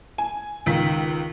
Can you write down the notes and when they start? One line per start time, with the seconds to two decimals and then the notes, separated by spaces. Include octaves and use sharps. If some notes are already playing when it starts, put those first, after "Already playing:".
0.18 G#5
0.66 C#2 D#3 B6